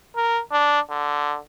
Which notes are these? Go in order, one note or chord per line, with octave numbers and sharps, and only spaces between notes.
A#4
D4
D3